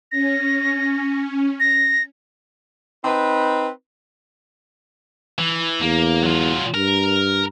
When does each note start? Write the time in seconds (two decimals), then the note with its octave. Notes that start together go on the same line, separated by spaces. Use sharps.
0.12 C#4 A#6
1.60 A#6
3.05 C4 D#4 B4
5.39 E3
5.81 E2 A#3
6.23 F#3 F4
6.74 G2 A#4